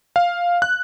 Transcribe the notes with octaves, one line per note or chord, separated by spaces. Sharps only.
F5
F#6